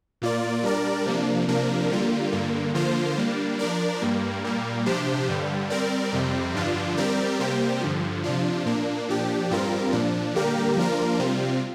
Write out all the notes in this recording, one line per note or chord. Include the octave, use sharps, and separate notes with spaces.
A#2 A#3 F4 D5
G3 D4 A#4 D5
C3 F3 A#3 D4
C3 F3 A#3 D4 A#4
D3 G3 A#3 F4
G2 D3 A#3
D3 F3 A#3 F4 C5
G3 A#3 D4
F3 D4 A#4 D5
G2 G3 A#3
A#2 G3 A#3
C3 F3 D4 G4 C5
G2 D3 G3
G3 C4 A#4 D5
F2 C3 G3 C4
G2 D3 F3 D4 F4
G3 C4 G4 A#4 D5
C3 G3 A#3 G4 C5
G2 D3 F3
C3 F3 D4 F4
A#2 A#3 D4
A#2 F3 D4 G4
G2 G3 C4 F4 A#4
A#2 F3 D4
D3 G3 A#3 G4 A#4
F3 A#3 D4 F4 A#4
C3 G3 C4 F4